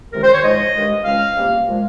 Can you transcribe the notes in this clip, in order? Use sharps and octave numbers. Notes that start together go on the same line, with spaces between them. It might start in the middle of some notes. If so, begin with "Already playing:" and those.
C#2 C3 D#3 G#3 A#4
C5
C#5
G#2 F3 G#3 D#5
G2 D#3 G#3
C#2 C#3 G#3 F5
C#2 C3 G3 A#3
A#2 F3 G#3